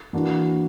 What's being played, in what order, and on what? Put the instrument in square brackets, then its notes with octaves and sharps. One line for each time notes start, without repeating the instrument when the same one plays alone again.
[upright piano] E3 A#3 D4 F#4